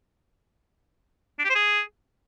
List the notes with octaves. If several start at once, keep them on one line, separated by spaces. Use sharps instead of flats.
D4
G4
C5
G#4